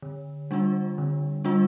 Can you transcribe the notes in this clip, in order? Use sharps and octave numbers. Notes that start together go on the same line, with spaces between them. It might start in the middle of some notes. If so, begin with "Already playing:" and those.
D3
G3 D4 F4
D3
G3 D4 F4